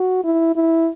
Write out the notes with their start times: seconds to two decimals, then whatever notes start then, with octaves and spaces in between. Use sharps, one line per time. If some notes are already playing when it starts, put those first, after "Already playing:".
Already playing: F#4
0.24 E4
0.56 E4